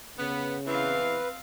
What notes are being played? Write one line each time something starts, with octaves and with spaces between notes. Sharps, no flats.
C#3 B3
E2 E3 C4 B4 F5